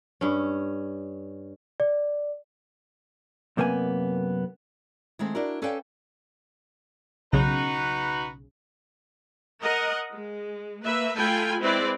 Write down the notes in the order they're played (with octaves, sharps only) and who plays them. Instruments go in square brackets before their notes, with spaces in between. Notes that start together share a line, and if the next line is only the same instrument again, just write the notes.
[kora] G2 C#4
[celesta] D5
[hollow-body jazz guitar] F#2 C3 A#3 B3 G#5
[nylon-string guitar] D#3 G#3 A3 C4
D4 E4 F#4 A#4
C#4 A4 B4 D5 F5 G5
[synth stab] B1 C#3 [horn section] D#4 F#4 B4
[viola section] A#4 D#5 F#5
G#3
A#3 B4 E5
A3 F4 A4 G5 G#5 B5
G#3 C4 E4 B4 D5